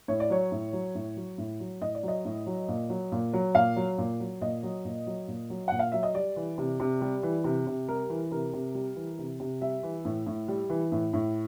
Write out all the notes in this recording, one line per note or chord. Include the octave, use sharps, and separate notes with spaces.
A2 C#5
D5
F#3 C#5
A2
F#3
A2
F#3
A2
F#3
A2 D#5
D5
F#3 D#5
A2
F#3
A#2
F#3
A#2
F#3
A#2 F5
F#3
A#2
F#3
A#2 D#5
F#3
A#2
F#3
A#2
F#3
A#2 F#5
F5
F#3 E5
D#5
G3 D5
E3
C3
C3
G3
E3
C3
C3
G3 A#4
E3
C3 A#4
C3
G3
E3
C3
C3
G3 E5
E3
A2
A2
G3
E3
A2
A2